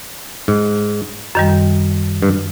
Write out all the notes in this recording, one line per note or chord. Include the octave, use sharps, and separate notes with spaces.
G#2
F#2 D#3 G3
G2